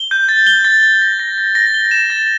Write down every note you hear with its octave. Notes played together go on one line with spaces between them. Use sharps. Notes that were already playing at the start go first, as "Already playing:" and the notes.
Already playing: G7
G6
A6
G7
A6
A6
A#6
A#6
A#6
A#6
G7
E7
A6